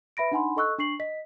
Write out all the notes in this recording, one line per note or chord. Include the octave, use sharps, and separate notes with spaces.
B4 E5 B5 A#6 D7
D4 D#4 F#5 G#5 B5 C6
A4 D#5 C#6 E6 F#6
D4 C#6 C7 F#7
D#5 B6